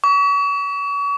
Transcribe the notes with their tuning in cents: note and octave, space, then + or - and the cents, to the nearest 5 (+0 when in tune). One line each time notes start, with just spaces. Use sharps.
C#6 +40